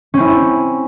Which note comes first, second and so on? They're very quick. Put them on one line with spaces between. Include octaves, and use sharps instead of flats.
C#4 C4 E4